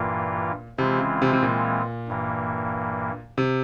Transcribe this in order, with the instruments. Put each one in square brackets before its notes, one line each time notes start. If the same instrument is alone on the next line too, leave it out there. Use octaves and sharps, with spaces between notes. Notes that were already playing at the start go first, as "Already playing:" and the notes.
Already playing: [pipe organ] G2 E3 A#3 F4 [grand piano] A#2
[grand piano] C3 [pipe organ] E3 G#3 C4 F4
[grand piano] C#3
C3
C3
A#2
[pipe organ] G2 E3 A#3
[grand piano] C3